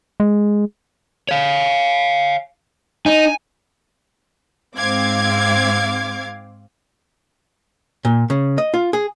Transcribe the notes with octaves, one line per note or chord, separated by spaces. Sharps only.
G#3
C#5 F5
D#4 G#5
G#2 C4 F5 D6 G#6
A#2
C#3
D#5
F4
G#4